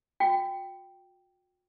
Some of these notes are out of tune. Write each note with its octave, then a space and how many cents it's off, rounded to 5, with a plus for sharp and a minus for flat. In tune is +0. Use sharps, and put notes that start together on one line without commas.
F#4 -45 G5 +0